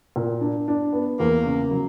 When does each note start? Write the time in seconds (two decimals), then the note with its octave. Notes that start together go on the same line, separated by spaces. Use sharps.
0.16 A#2
0.41 D4
0.68 D4
0.93 B3
1.19 E2 A#3
1.45 C#3
1.71 F#3